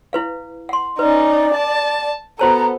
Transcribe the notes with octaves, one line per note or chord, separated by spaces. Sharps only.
E4 B4 F5
F#5 C6
C#4 D#4 B4 D5
A5
B3 F#4 A4 C5 A5 A#5